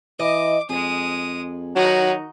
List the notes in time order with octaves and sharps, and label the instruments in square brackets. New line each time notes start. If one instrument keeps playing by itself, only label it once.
[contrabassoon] E3 [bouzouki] D#5 [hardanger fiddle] D6
[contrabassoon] F2 [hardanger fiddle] G#3 D#6 [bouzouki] G#4
[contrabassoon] D#3 [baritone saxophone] F#3 [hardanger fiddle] D#4 F#4